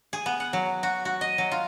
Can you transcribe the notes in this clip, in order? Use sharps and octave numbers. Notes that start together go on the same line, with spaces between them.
G#4
B3
F#5
F#3
F#4
F#4
D#5
F#3
F4